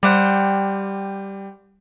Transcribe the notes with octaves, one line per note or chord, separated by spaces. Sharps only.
G3 G4 C5 F#5